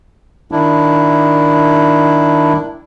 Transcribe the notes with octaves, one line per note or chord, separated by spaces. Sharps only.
D#3 D4 E4